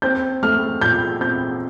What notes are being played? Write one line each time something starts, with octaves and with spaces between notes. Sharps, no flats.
C4 G6
A3 F6
A#2 G6
C4 G6